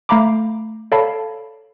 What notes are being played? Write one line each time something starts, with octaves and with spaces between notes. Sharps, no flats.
A3 F5 A#5 B5 D6
A4 C#5 D5 F5 A5 B5